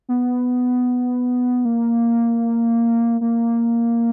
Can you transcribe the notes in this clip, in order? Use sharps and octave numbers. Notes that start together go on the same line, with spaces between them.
B3
A#3
A#3